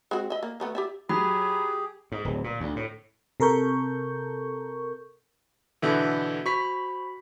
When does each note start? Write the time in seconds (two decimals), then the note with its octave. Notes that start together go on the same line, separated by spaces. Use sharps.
0.11 G#3 C4 F#4
0.30 D#5 E5
0.43 A#3
0.60 D#3 A3 B3
0.75 G4 D5 E5
1.09 F#3 G4 G#4 B5
2.12 G#2
2.25 D1
2.44 A#2
2.60 D2
2.76 A2
3.40 C3 A4 A#4 C#6 G6
5.82 B2 D3 E3 A4 E5 G6
6.46 F#4 C5 B5 C#6 B6